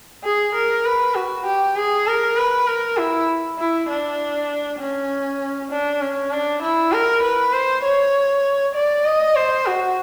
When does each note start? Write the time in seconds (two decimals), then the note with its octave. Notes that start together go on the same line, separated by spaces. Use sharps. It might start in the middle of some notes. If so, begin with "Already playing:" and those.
0.24 G#4
0.55 A#4
0.85 B4
1.15 F#4
1.46 G4
1.76 G#4
2.07 A#4
2.37 B4
2.67 A#4
2.97 E4
3.58 E4
3.89 D4
4.79 C#4
5.71 D4
6.01 C#4
6.31 D4
6.62 E4
6.92 A#4
7.23 B4
7.53 C5
7.83 C#5
8.75 D5
9.06 D#5
9.35 C5
9.66 F#4